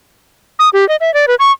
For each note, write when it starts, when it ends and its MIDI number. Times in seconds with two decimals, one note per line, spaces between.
0.59 0.69 87
0.73 0.87 67
0.89 0.96 75
1.01 1.13 76
1.14 1.25 74
1.28 1.35 71
1.39 1.52 85